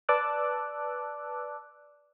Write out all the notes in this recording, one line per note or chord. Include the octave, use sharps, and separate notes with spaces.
B4 D5 A5 D6 E6 F#6